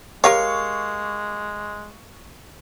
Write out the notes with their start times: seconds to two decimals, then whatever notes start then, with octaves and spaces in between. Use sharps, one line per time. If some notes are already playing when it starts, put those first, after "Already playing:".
0.24 G#3 G4 A#4 C#5 F5 C#6